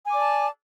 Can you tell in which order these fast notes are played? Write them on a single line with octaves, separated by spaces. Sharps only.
G#5 D6 D5 A5